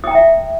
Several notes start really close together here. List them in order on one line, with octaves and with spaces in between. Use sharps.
D#6 G5 A#5 E5